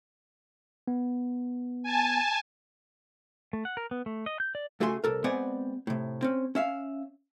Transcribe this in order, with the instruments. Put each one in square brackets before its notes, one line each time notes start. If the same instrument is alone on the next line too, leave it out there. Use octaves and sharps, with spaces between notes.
[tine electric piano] B3
[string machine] G#5 A5
[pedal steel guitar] A3
F#5
A#4
B3
A3
D#5
G6
D5
[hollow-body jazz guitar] C#2 A3 F#4 G#4 G#5 C6
C2 A4 A#4
G#3 B3 C4 D5 F#5 G#5
A2 C3
C4 C#4
C#4 E5 F5